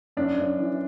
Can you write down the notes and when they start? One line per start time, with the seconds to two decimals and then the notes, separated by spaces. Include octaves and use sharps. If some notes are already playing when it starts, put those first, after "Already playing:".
0.17 F#2 D4
0.38 F#2
0.59 E3